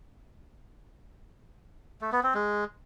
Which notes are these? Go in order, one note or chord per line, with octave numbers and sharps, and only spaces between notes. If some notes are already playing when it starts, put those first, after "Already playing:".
A3
B3
C4
G#3